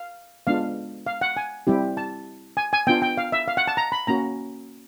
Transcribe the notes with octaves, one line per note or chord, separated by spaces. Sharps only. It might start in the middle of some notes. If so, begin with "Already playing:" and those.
Already playing: F5
G#3 B3 D4 F4 F5
F5
F#5
G#5
G3 C4 E4 G4
A5
G#5
G#5
B3 D4 F4 G5
G5
F5
E5
F5
F#5
A5
A#5
B5
A#3 C#4 F#4 A#5